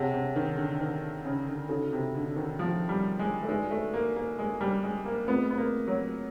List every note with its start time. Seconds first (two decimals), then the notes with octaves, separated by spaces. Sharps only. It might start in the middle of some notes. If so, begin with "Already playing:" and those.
Already playing: C3 G#4 C#5 F#5 A5
0.14 C3
0.36 D#3
0.57 D3
0.81 D#3
1.25 C#3
1.48 D3
1.69 C#3 D#4 F#4 A4
1.93 C3
2.15 D3
2.36 D#3
2.59 F3
2.89 G3
3.19 G#3
3.43 A3
3.48 G#3 D#4 F#4 B4 D5
3.71 A3
3.94 A#3
4.16 A#3
4.39 G#3
4.61 G3
4.83 G#3
5.06 A#3
5.28 A3 B3 C4 F4 G#4
5.50 B3
5.58 A#3
5.88 F#3